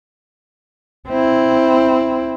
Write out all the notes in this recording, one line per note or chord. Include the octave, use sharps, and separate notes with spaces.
C4 E4